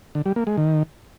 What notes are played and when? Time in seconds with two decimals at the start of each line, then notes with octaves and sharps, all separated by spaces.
0.15 D3
0.26 G3
0.36 A#3
0.47 G#3
0.57 D#3